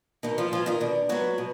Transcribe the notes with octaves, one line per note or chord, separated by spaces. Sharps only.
B2 D#3 D#4
F3 F4
F3 G#3 B3 F4
D#3 D#4
B2 D4
F#3 G#3 B3 F#4
B2